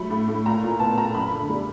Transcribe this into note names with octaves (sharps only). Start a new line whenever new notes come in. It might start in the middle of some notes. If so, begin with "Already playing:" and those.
Already playing: F#3 A3 B5
A2
A2
A#2 A#5
A#2
B3 A5
A#2 A#5
F#2 B5
D3
G3